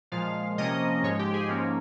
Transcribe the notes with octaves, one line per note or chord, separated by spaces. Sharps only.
A#2 F3 G#3 F5
C3 F3 A#3 C#4 D#5
G#2 F3 G#3 C#5
G4
G#4
G#2 F3 A#3 C#4